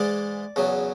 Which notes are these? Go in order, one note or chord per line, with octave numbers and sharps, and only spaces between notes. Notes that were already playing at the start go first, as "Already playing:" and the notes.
Already playing: G#2 E3 G#3 D5
E2 C#3 F#3